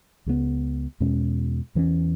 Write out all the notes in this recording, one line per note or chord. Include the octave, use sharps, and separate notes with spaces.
C#2 C#3 F#3 B3
E2 B2 G#3 C#4
E2 E3 G#3 C#4